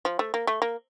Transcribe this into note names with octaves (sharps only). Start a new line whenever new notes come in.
F3
A3
A#3
A3
A#3